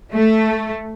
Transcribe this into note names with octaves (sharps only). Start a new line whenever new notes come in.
A3